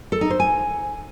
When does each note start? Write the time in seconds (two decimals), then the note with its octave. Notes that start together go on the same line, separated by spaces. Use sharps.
0.12 A4
0.21 D#4
0.30 C5
0.40 G#5